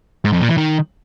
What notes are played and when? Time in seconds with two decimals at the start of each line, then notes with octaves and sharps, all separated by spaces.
0.25 G#2
0.33 F2
0.41 A#2
0.49 E3
0.57 D#3